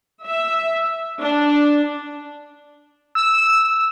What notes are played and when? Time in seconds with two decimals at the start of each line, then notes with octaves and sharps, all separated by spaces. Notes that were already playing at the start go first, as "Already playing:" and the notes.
0.24 E5
1.19 D4
3.15 E6